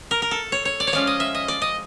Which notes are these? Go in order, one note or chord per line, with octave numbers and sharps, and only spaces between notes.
A#4
A#4
A4
C#5
C#5
D5
C#5
F3 G#3 C#4 F4 D5
D#5
E5
D#5
D5
D#5